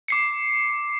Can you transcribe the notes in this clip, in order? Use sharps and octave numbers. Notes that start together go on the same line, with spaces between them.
D6 C7 C#7